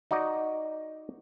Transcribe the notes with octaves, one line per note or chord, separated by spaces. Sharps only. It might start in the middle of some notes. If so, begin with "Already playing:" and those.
D#4 F#4 D5 D#5